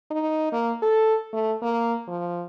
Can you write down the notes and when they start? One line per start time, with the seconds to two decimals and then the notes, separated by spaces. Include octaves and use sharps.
0.11 D#4
0.52 A#3
0.82 A4
1.33 A3
1.62 A#3
2.08 F3